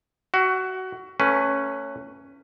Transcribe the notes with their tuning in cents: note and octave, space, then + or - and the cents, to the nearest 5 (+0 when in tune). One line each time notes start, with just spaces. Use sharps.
F#4 +20 E5 +35
A3 +35 C#4 +0 B4 +15